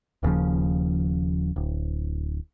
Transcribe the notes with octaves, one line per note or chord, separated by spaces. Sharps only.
D#1 D#2 C#3 F3
D1